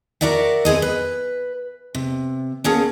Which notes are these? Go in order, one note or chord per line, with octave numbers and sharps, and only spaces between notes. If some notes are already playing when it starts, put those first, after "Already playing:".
F#4 A#4 D5 E5 F#5
B3 C4 G#4 D#5
B4
C3
A#3 B3 C#4 F#4 G#4 A4